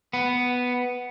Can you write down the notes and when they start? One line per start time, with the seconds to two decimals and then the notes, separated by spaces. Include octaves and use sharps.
0.13 B3